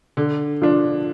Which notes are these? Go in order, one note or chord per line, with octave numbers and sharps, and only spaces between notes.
D3
F3 D4